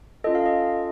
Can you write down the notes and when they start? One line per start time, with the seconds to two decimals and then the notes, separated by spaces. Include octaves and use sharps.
0.24 C#4 F4 A4 D#5
0.35 F5
0.46 D#5